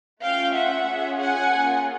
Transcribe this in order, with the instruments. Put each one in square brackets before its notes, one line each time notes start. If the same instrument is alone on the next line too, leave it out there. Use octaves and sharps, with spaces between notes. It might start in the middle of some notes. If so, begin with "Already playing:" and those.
[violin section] A3 C#4 F4 F5 G5
E5 F#5
C#4 F4 G#4
F#5 G#5
A#3 C#4 F4 G#4